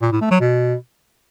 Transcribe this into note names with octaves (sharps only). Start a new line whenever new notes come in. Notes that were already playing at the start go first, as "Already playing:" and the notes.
A#2
A2
A3
F#3
B2